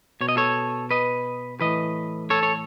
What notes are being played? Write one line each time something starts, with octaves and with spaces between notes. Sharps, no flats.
B2 C#5
D#5
A4 C#5
B4 D#5
A2 E3 B4 D#5
A4 C#5
C#5